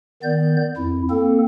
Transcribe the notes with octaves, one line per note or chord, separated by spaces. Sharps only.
D#3 B3 D5 G6
F2 E4
A#3 C4 A4